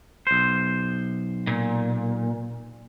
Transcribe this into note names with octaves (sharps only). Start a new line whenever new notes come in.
B1 C5
A#2